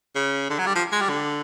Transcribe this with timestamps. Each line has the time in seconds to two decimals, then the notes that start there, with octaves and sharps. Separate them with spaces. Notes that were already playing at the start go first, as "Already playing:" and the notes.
0.16 C#3
0.50 D3
0.59 F#3
0.67 G3
0.75 F3
0.92 G#3
1.01 G3
1.09 D3